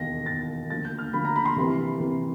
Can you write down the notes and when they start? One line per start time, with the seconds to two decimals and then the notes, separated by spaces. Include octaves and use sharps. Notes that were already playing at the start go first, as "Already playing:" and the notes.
Already playing: E1 D#2 D#3 A#6
0.26 E1 D#2 D#3 A6
0.69 D2 D3 F3 A#3 A6
0.85 G6
0.99 F6
1.13 D2 D3 F3 A#3 B5
1.25 A#5
1.36 B5
1.45 C6
1.56 C2 C3 E3
2.00 C2 C3 E3